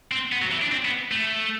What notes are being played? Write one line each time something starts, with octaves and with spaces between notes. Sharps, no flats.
C4
B3
F#3
E3
D4
C4
B3
A3